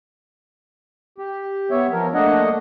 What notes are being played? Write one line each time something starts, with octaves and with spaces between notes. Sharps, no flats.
G4
B3 C#5 E5
F3 A#4
A3 A#3 D4 D#5 F#5